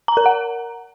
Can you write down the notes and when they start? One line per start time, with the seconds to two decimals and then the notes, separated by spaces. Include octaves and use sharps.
0.08 A#5
0.17 A#4
0.26 F#5